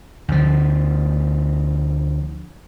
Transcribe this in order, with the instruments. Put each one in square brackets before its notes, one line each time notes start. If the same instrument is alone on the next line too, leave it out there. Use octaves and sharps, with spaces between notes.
[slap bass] D2 F3